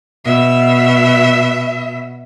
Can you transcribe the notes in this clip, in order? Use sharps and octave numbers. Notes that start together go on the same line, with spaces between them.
B2 E5